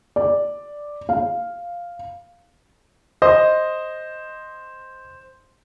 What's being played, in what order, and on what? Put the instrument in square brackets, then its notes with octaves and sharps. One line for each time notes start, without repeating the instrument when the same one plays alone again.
[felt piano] D5
F5
[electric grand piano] C5 [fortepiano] D#5